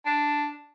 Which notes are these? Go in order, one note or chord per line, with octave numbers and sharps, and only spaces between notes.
D4